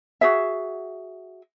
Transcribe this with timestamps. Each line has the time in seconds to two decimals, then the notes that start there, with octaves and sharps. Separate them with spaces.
0.21 F#4 G#4 E5